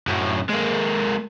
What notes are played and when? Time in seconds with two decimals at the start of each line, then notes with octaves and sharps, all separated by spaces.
0.07 F#2 A2
0.50 G#3 A#3